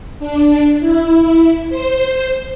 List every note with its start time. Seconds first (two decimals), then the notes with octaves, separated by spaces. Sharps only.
0.19 D4
0.80 E4
1.69 C5